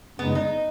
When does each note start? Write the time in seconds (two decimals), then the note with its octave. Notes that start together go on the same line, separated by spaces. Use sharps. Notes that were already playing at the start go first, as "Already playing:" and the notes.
0.19 F#2 C#3 G#3 B3 D#4
0.35 D#4